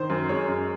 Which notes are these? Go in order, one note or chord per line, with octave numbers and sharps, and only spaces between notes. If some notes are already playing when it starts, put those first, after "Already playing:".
Already playing: D#3 C5
F#2
G#3 C#5
F#2